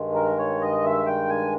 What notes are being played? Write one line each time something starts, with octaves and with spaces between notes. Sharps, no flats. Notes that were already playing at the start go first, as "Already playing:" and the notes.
Already playing: G2 D#3 G#3
A#4
C#5
D#5
E5
G5
G#5